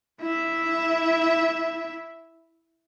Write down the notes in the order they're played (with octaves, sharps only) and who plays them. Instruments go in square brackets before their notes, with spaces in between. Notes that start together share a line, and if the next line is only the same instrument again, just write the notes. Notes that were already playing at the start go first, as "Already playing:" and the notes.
[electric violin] E4 E5